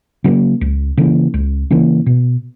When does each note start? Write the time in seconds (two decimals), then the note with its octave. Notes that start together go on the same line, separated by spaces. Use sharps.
0.24 C#3 F#3 A#3
0.61 C#2
0.97 C#3 E3 A#3
1.34 C#2
1.70 C#3 E3 A#3
2.06 B2